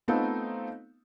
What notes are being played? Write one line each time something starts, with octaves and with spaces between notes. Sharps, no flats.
A3 B3 C4 D#4 F4 A4